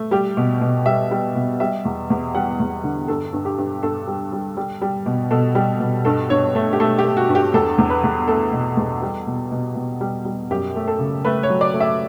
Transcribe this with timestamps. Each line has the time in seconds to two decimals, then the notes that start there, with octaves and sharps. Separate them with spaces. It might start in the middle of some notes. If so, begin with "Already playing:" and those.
Already playing: A3
0.11 G3 G4
0.37 B2
0.61 B2
0.86 G3 E5
1.11 G3
1.35 B2
1.60 G3 E5
1.85 E2
2.10 E2
2.35 G3 F#5
2.60 E2
2.83 D3
3.08 G2 A4
3.33 G2
3.45 G4
3.58 G2
3.82 G2 A4
4.08 G3
4.33 G3
4.57 G3
4.82 G3
5.06 B2
5.31 B2 A4
5.55 G3
5.80 B2
6.05 G2 A4
6.30 G2 C#5
6.55 A3
6.73 G4
6.80 A3 A4
6.98 G4
7.04 A3
7.17 F#4
7.29 G2
7.35 G4
7.54 E2 A4
7.78 E2
7.90 B4
8.03 E2
8.28 A3 A4
8.52 B2
8.77 E2
9.02 G3
9.27 B2
9.52 B2
9.75 B2
10.01 G3
10.25 G3
10.51 F#2 G4
10.76 A3
10.88 A4
10.99 C#3
11.25 A3 B4
11.43 C#5
11.50 F#3
11.61 D5
11.74 A3
11.80 E5